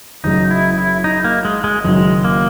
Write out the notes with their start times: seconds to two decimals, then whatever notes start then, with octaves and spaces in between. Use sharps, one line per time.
0.24 F#1 F#2 C#3 F#3 D#4
0.51 E4
0.78 E4
1.04 D#4
1.24 A#3
1.45 G#3
1.64 G#3
1.84 F#1 F#2 D#3 G#3
2.25 A#3